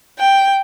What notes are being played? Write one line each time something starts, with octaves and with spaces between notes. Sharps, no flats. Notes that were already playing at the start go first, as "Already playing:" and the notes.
G5